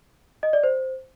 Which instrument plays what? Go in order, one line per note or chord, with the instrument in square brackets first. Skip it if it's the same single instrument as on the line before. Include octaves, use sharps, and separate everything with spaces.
[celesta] D#5
D5
C5